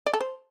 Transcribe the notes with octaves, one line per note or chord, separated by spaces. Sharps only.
D5
A4
C5